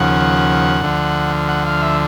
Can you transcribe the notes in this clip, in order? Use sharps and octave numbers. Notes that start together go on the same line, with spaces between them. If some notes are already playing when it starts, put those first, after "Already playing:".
Already playing: D#2 C#3 F3 F#5
D2 D3 F3
F#5
F5
E5